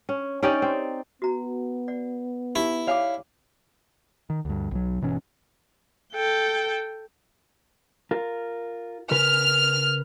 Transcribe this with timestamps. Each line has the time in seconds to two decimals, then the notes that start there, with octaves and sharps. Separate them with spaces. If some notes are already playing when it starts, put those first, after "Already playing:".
0.09 C#4
0.43 C#4 D#4 G4 D5
0.62 C4
1.22 B3 F#4 A#5
1.88 D5 F#5
2.56 D#4 E4 G4
2.87 C#5 D5 F5 G#5 D6
4.30 D#3
4.45 D2 G2
4.71 B1 B2 F#3
5.01 G1 B2 E3 C#4
6.13 A4 G5
8.11 F4 A#4
9.11 C#3 A#4 B4 F6